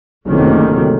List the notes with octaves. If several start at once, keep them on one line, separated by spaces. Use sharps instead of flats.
F#1 D2 C3 D#3